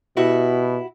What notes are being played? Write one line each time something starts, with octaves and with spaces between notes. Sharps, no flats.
B2 E4 F#4 G4